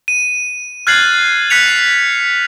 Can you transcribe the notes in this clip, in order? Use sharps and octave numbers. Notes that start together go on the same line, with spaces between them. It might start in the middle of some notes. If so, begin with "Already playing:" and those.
D#7
F6 F#6 G#6 A6 C7 F#7
F#6 B6 C#7 F7